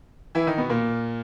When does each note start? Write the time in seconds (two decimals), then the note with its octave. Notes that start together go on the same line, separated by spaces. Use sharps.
0.35 E3 E4
0.47 D#3 D#4
0.58 B2 B3
0.70 A#2 A#3